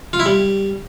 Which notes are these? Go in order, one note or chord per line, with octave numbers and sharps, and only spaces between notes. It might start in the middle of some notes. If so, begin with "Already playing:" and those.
F4
E4
G3